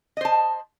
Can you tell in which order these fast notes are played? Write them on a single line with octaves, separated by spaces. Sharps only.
D#5 C5 A5